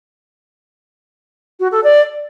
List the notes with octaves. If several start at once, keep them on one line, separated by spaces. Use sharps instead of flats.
F#4
A4
D5